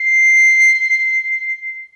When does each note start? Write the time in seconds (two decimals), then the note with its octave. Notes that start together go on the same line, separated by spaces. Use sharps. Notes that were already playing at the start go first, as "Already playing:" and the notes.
Already playing: C7